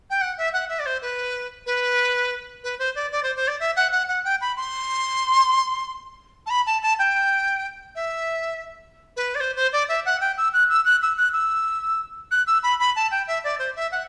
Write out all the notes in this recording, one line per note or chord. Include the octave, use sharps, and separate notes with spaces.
G5
F#5
E5
F#5
E5
D5
C5
B4
B4
B4
C5
D5
D5
C5
C5
D5
E5
F#5
F#5
F#5
G5
B5
C6
A5
B5
A5
A5
G5
E5
B4
D5
C5
C5
D5
E5
F#5
G5
E6
F#6
E6
F#6
E6
F#6
E6
F#6
E6
B5
B5
A5
G5
E5
D5
C5
E5
F#5